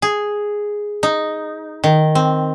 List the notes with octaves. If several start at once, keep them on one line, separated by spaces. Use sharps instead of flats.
G#4
D#4
D#3
C4